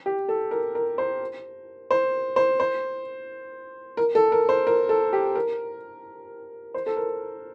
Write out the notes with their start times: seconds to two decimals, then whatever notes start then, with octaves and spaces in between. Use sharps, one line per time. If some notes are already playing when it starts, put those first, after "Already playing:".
0.06 G4
0.29 A4
0.51 A#4
0.75 A#4
0.98 C5
1.91 C5
2.36 C5
2.60 C5
3.97 A#4
4.15 A4
4.32 A#4
4.49 C5
4.67 A#4
4.89 A4
5.13 G4
5.35 A#4
6.74 C5
6.86 A4
6.97 A#4